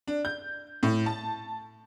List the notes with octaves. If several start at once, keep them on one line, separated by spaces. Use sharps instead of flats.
D4
G6
A2
A5